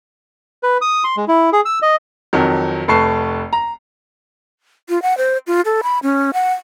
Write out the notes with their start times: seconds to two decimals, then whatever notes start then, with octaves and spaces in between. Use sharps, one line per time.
0.63 B4
0.81 D#6
1.04 C6
1.17 G#3
1.28 E4
1.53 G#4
1.65 E6
1.82 D#5
2.33 F2 D#3 F#3
2.88 F1 A3 B4 A5 C#6 C7
3.53 A#5
4.89 F4
5.02 F#5
5.18 C5
5.47 F4
5.65 A4
5.83 B5
6.03 C#4
6.33 F#5